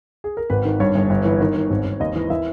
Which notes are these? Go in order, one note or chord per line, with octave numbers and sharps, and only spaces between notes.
G#4
A#4
G#1 B4
D#3
G2 C#5
G1
G1
E3
D#3
D#3
G#1
G#1
D#2 D#5
E3
E3 E5